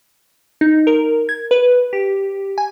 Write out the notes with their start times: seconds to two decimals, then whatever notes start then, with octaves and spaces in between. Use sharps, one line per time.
0.61 D#4
0.87 A#4
1.29 G#6
1.51 B4
1.93 G4
2.58 G#5